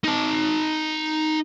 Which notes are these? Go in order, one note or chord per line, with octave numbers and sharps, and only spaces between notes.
D#4 A5